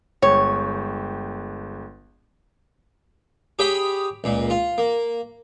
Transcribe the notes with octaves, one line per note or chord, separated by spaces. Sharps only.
G1 G#3 C#5 G5
G4 G#4 C#5 G5 B5 D#6
C#2 A#2
F4
A#3